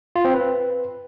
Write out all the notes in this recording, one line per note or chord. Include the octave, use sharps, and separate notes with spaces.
F4
C4
B4